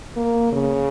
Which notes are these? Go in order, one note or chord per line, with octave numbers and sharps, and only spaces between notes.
A#3
C#3